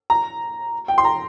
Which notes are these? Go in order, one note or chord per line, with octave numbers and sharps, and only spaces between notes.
A#5
G5
C6
A#5